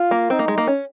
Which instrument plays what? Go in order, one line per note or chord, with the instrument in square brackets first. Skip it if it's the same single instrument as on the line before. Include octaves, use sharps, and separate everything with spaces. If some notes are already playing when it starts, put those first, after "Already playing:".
Already playing: [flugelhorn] F4
[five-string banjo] A#3
[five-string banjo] C4 [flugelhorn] D#4
[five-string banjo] A#3
G#3
A#3
C#4